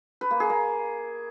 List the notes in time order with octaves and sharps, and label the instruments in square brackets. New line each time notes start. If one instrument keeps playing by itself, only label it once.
[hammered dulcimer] B4
A#3
G#4
A#3